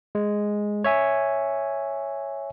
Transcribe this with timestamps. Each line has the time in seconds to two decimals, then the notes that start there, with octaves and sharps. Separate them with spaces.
0.15 G#3
0.84 C#5 E5 G#5